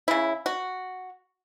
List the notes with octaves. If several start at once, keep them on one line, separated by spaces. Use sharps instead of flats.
C#3 E4
F#4